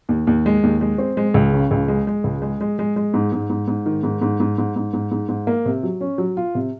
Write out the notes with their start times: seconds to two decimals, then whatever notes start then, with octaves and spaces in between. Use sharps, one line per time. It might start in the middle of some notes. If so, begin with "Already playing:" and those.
0.09 D#2
0.27 D#2
0.46 G#3
0.63 D#2
0.81 G#3
0.98 C4
1.17 G#3
1.34 C#2
1.53 C#3
1.71 C#2
1.88 G#3
2.07 G#3
2.24 C#2
2.42 G#3
2.61 G#3
2.79 G#3
2.96 G#3
3.14 G#2
3.32 G#2
3.50 G#2
3.68 G#2
3.86 D#3
4.03 G#2
4.21 G#2
4.40 G#2
4.58 G#2
4.76 G#2
4.93 G#2
5.11 G#2
5.29 G#2
5.47 A#3
5.66 C3
5.83 F#3
6.01 C#4
6.18 F#3
6.37 F4
6.55 C3